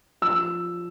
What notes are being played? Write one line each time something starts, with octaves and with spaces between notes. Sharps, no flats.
F3 E6